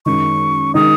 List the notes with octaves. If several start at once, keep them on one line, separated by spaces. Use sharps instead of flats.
F#2 D#3 G#3 D#4 C#6
D#3 G#3 D#4 D#6